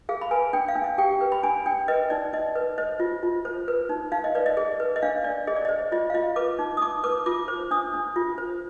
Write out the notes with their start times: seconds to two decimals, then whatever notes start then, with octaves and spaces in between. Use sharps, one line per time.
0.09 G#4 F5
0.21 B5
0.31 B4 G#5
0.53 D4 G5
0.68 F5
0.75 D4
0.84 F5
0.98 G4 G5
1.21 B4
1.32 B5
1.43 D4 G#5
1.66 D4 G5
1.88 B4 D#5
2.10 D#4 D5
2.33 D#4 D#5
2.55 B4
2.78 C5 D#5
3.00 F4
3.23 F4
3.45 C5
3.68 B4
3.89 D#4
4.12 D#4 F5
4.24 D#5
4.35 B4 D5
4.46 D#5
4.57 G#4 D#5
4.80 B4
4.96 D#5
5.02 D4 F5
5.24 D4 D5
5.47 G#4 D#5
5.56 D5
5.65 D#5
5.69 C5
5.92 F4 D#5
6.10 F5
6.14 F4 D#5
6.36 B4 D6
6.59 D#4
6.77 D#6
6.81 D#4 D6
7.04 B4 D6
7.26 F4 D6
7.48 C5
7.71 D4 D#6
7.93 D4
8.16 F4
8.38 C5